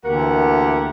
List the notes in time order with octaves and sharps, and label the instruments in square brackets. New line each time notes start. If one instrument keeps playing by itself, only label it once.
[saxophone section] D2 E3 A#3 G4 A#4 F#5